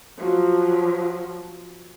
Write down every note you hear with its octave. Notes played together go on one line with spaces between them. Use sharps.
F3 F#3